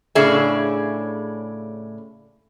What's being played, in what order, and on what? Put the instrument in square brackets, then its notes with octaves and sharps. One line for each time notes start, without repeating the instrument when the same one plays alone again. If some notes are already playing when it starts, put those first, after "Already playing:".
[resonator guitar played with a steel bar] A2 C#3 C#4 D4 G#4 E5